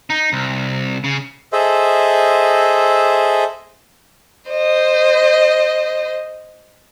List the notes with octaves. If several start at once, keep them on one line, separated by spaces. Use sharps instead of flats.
D#4
C2
C#3
G#4 A4 C5 D#5 E5
C5 D#5